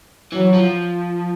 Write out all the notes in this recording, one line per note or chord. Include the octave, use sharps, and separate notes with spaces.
E3 F#3
F3